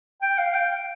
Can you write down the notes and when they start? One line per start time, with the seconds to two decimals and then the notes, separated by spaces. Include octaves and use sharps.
0.22 G5
0.38 F5
0.54 G5